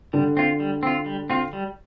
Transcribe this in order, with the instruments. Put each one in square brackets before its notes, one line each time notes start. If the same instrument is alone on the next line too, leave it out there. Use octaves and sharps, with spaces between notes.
[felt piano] D3 [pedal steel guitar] G3
[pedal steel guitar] C4 F4
G3
C4 F4
G3
C4 F4
G3